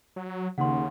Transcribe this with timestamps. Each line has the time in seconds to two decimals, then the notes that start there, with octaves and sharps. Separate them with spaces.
0.16 F#3
0.58 D#2 C#3 F#5 C6